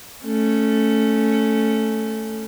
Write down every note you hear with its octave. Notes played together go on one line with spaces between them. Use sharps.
A3 C#4